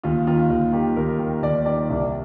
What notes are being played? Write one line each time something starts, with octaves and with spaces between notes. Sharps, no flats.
D#2 F4
D#3 F4
D#2
D#3 G4
D#2 A#4
D#3
D#2 D5
D#3 D5
C2 D5